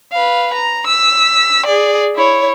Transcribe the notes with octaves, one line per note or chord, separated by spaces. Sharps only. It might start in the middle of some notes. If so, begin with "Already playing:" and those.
B4 F5
A#5
E6 B6
G#4 D5
E4 C#5